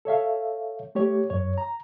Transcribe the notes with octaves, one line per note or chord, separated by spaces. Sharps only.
A4 C#5 E5 F5
A3 G4 C#5
F#2 C#5
A#5